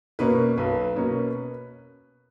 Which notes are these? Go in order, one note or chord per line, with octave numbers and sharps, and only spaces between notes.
B2 A#3 C#4 B4
B1 B4
B2 A#3 C#4